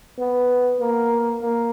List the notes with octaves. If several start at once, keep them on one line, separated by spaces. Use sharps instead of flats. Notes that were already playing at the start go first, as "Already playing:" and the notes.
B3
A#3
A#3